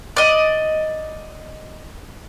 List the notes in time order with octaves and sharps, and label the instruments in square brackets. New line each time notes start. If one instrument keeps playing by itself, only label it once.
[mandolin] D5 D#5